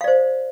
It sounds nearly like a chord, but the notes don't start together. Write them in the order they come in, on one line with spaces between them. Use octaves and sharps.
F5 D5 C5